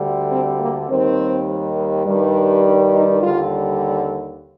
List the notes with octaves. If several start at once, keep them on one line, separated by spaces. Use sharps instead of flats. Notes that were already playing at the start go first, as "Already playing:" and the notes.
Already playing: D2 D3 G3
C4
A#3
D#2 D#3 G3 C4
G2 D#3 G3
D4
D#4
D#2 D3 G3 F4